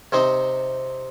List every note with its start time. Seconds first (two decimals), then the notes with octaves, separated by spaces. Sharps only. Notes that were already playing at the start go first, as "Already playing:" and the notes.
0.12 C3 C4 D#4 C5